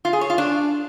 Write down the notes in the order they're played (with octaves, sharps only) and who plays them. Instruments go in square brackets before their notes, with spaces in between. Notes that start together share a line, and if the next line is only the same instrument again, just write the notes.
[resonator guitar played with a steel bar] F4
G#4
C#5
F4
D4